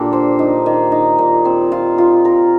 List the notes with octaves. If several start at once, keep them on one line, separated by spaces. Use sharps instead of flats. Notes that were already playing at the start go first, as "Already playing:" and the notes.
Already playing: A#2 D3 D4 G4
C5
D#4
D#3
D#4
A#2
C4
F4
F4
A#4